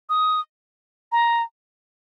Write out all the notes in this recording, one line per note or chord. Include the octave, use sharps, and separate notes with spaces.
D#6
A#5